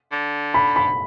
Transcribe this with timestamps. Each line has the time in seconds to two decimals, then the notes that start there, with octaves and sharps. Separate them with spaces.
0.12 D3
0.54 B5
0.76 B5